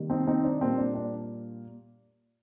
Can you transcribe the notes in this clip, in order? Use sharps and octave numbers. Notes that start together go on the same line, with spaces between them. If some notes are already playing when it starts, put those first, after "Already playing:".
Already playing: C3 D#3 G3 A#3
C4 D#4
C4 D#4
D4
A#2 G3 A#3 C4
D4
D4